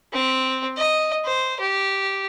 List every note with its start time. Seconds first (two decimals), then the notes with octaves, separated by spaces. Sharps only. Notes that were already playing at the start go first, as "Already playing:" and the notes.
0.13 C4
0.77 D#5
1.25 C5
1.60 G4